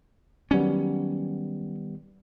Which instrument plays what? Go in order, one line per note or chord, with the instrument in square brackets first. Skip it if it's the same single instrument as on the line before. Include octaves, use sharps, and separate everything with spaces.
[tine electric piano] D#3 G3 B3 [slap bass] F#3 C#4